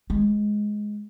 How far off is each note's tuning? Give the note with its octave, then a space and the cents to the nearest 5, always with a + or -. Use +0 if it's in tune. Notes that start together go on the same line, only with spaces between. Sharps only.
G#3 +5